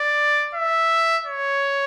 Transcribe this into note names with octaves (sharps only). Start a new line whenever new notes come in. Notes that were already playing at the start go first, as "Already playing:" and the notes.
Already playing: D5
E5
C#5